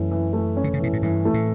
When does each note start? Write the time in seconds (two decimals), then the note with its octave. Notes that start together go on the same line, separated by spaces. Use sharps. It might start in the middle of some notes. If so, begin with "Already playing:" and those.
Already playing: F#2 E3 A3 C#4
0.11 E3
0.33 A3
0.57 C#4
0.64 D3
0.73 C#3
0.80 B2 E3
0.93 A2
1.02 G2 E3
1.25 A3
1.34 A2